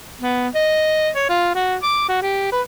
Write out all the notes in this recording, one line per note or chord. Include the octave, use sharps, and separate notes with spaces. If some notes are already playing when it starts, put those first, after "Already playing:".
B3
D#5
C#5
F4
F#4
D6
F#4
G4
B4